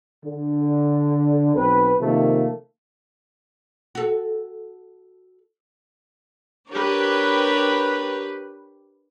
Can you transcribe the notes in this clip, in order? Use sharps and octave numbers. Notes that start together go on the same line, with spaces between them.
D3
B1 C4 B4
C3 D#3 F3 A3 A#3
F#4 A4
D4 G4 A#4 B4 C#5